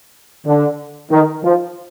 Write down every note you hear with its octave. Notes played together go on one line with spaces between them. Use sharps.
D3
D#3
F3